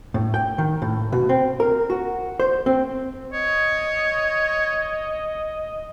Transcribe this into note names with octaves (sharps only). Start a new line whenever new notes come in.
A2
G5
D#3
A2
B2
C4
A#4
F#4
C5
C4
C#5 D#5